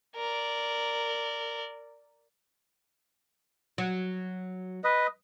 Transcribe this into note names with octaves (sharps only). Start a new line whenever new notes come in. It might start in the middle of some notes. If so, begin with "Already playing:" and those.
A#4 D5
F#3
B4 D#5